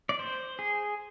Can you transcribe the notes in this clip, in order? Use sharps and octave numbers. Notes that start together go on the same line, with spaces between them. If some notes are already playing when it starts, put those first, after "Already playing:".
D5
C5
G#4